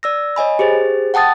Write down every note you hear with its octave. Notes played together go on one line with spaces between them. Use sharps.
D5 E6 A#6
C#5 D#5 G#5 B5
G4 G#4 C5 A6
F#5 G5 A5 D#6 A6